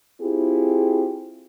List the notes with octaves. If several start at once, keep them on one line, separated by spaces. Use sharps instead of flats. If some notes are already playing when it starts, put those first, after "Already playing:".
C4 E4 F4 G4 G#4